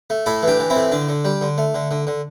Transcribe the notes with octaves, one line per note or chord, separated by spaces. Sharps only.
A3
A2 E4 A4
E3 D4 G4
E3
C4 E4
A2
D3 D4
D3
G3
D3
A3
D3
D3
D3